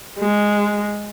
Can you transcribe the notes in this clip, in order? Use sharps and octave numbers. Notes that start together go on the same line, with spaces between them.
G#3